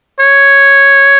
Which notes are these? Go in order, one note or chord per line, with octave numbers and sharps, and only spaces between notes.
C#5